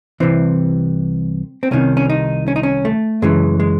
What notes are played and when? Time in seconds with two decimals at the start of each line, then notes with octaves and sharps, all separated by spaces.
0.20 C2 C3 E3 C4
1.63 C4
1.71 C2 C3 D#3 C#4
1.97 C#4
2.10 D#4
2.48 C#4
2.56 D#4
2.63 C#4
2.85 A3
3.22 F#2 C#3 E3 G#3
3.60 G#3